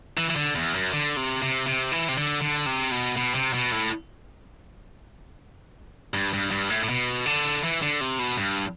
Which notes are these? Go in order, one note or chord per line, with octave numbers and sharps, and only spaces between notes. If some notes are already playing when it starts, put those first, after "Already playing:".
E3
E3
D3
E2
F#2
D3
C3
C3
C3
E3
C3
D3
D3
C3
B2
B2
C3
B2
A2
G2
G2
G2
A2
A2
B2
D3
E3
D3
C3
B2
G2